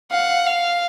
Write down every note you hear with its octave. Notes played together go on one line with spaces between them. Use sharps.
F5 F#5
F5